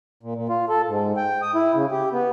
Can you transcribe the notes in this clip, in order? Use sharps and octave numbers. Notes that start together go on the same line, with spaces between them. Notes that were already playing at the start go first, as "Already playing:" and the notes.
A#2
A#2
F4
A4
G#2
G5
D#6
E4
C#3
G4
B3